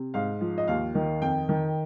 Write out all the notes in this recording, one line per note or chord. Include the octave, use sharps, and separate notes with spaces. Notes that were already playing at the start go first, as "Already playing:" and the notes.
Already playing: C3
G#2 F5
F3
D#5
D#2 F5
D#3
F2 G5
D#3